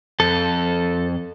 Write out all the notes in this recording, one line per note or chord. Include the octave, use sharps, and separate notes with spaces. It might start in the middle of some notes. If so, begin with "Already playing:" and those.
F2 A4